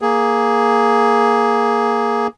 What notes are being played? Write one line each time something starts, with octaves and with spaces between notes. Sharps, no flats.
A#3 G#4